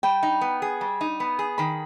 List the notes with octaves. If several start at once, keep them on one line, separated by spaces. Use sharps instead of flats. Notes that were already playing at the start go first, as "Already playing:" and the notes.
G3 G5
D#4
B3
G#4
G3
D#4
B3
G#4
D#3 B5